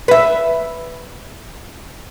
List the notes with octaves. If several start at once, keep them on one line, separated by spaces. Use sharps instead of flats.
B4 E5